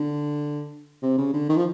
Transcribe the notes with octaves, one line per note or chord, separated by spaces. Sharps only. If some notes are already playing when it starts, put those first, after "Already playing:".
Already playing: D3
C3
C#3
D3
D#3
F3